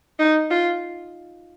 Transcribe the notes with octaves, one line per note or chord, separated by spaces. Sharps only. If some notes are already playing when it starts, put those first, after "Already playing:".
D#4
F4